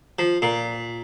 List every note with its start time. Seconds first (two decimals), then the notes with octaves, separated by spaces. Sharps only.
0.19 F3
0.42 A#2